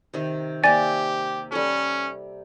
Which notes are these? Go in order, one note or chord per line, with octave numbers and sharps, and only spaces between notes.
C3 D#3
C3 A#3 G4 D5 G#5 A6
G3 C#4 A4